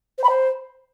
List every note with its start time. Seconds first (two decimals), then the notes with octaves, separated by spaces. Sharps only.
0.18 C5
0.23 B5
0.29 C5